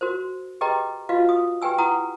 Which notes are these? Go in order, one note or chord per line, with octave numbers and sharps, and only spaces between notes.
F#4 A#4 C5
G4 G#4 B4 D#5 G5 A#5
F4 F#4 B4 D#5 F5
D#6
G4 B4 G5 G#5 E6
E4 B4 F#5 A#5 D#6